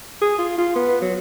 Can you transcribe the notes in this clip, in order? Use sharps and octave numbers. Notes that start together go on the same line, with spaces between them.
G#4
F4
F4
B3
F#3